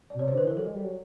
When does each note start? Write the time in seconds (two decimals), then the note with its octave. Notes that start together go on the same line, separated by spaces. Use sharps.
0.10 D5
0.14 B2
0.19 C3 C#5
0.28 C5
0.32 D3
0.37 B4
0.44 E3 A#4
0.57 F#3 A4
0.66 G#3
0.75 G3
0.84 F#3